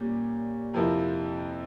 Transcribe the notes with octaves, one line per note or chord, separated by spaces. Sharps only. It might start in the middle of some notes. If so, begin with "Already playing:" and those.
Already playing: A#2 G3 C#4
F2 C3 F3 C4 E4 A#4